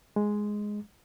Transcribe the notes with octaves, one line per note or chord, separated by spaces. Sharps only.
G#3